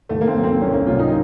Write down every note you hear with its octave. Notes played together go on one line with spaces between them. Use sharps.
D#2 A3
A#3
C4
D#3 F#3
C4
C2 C#4
A#3
C3 F#3 F4
D#4